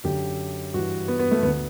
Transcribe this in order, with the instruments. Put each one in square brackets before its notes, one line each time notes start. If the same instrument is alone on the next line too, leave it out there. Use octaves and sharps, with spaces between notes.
[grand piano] F#2 D3 G4
G2 E3 F#4
B3
B3
A3
D2 B3
D3